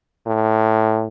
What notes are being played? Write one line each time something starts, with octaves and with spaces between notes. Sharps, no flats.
A2